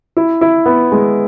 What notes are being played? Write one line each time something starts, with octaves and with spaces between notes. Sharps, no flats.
E4
E4
B3
G#3